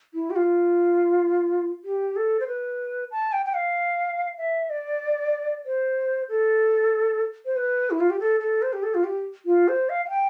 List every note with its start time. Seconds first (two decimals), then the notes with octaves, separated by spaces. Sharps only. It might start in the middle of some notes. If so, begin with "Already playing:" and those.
0.14 E4
0.30 G4
0.36 F4
1.85 G4
2.16 A4
2.40 C5
2.47 B4
3.11 A5
3.33 G5
3.46 G5
3.54 F5
4.38 E5
4.70 D5
5.66 C5
6.29 A4
7.45 C5
7.56 B4
7.90 E4
8.00 F4
8.10 G4
8.20 A4
8.40 A4
8.62 C5
8.73 G4
8.83 A4
8.94 F4
9.04 G4
9.46 F4
9.68 C5
9.89 F5
10.05 F5
10.09 G5